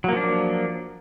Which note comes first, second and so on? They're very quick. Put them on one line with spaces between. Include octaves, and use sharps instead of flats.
F#3 A#3 F3 D4